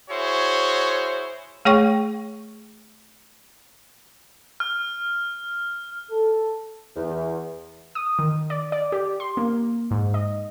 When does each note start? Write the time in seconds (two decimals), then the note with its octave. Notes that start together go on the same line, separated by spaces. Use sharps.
0.11 E4 F#4 G#4 C5 C#5
1.65 A3 G#4 C#5 G5 C#6
4.60 F6
6.11 A4
6.96 E2
7.95 D#6
8.19 D#3
8.50 D5
8.72 D5
8.92 G4
9.20 C6
9.37 A#3
9.91 G#2
10.14 D#5